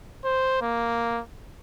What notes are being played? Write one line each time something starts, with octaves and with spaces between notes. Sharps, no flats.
C5
A#3